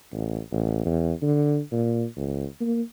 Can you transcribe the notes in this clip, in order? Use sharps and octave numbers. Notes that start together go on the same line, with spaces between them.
A1
A1
E2
D3
A#2
C#2
A#3